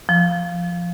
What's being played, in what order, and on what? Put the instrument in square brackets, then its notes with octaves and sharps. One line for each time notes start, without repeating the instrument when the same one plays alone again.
[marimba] F3